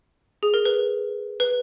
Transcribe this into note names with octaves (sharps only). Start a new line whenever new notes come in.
G#4
A#4
B4
B4